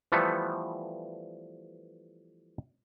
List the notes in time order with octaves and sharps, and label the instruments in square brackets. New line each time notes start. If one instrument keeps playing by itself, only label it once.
[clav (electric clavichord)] E3 F3 G3 A3 B3 A4